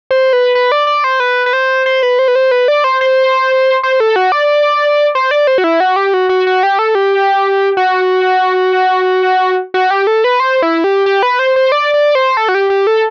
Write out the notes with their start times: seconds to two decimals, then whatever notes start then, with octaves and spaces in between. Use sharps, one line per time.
0.11 C5
0.33 B4
0.55 B4
0.72 D5
0.87 D5
1.04 C5
1.20 B4
1.46 B4
1.53 C5
1.86 C5
2.03 B4
2.19 C5
2.28 B4
2.35 C5
2.51 B4
2.68 D5
2.84 C5
3.01 C5
3.83 C5
4.00 A4
4.16 F#4
4.32 D5
5.15 C5
5.31 D5
5.47 C5
5.58 F#4
5.64 E4
5.80 F#4
5.96 G4
6.14 F#4
6.29 F#4
6.47 F#4
6.63 G4
6.79 A4
6.95 G4
7.77 F#4
9.74 F#4
9.91 G4
10.07 A4
10.24 B4
10.40 C5
10.62 E4
10.84 G4
11.06 G4
11.23 B4
11.39 C5
11.56 C5
11.72 D5
11.94 D5
12.15 C5
12.37 A4
12.49 F#4
12.55 G4
12.70 G4
12.87 A4